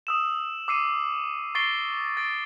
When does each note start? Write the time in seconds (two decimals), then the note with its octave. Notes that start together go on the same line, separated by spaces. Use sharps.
0.07 D#6 E6 E7
0.68 D6 E6 C7 C#7 D#7
1.55 C#6 A6 A#6 C7 D7 G7
2.17 A6 D7